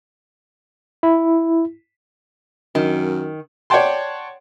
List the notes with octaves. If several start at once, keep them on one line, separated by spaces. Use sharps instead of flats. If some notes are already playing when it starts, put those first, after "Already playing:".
E4
F#2 D#3
C#5 D5 F#5 G5 A5 C6